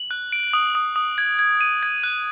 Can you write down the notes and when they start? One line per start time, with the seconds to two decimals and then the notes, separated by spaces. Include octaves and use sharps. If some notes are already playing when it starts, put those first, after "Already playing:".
Already playing: F#7
0.11 F#6
0.32 D7
0.53 D#6
0.75 D#6
0.96 D#6
1.18 G#6
1.39 G#6
1.61 D#7
1.83 G#6
2.03 F#6